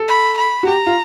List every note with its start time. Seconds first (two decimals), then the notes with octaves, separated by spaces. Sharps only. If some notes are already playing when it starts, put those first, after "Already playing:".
Already playing: A4
0.08 B5
0.38 B5
0.63 F#4
0.67 G4 A#5
0.86 F4